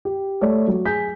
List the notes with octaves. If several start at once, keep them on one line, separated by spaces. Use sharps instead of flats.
G4
A3 C#5 D5
F#3
G#4 G#5 G6 B6